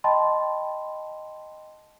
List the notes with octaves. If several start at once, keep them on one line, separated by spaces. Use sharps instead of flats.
D#5 G5 A5 B5 C6